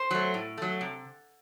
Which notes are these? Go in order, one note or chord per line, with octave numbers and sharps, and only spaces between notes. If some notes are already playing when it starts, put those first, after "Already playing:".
Already playing: C5
F#3 A3
A2
F#3 A3
C3